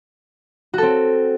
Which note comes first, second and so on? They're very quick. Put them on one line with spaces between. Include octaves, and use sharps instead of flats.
F#4 A4 C4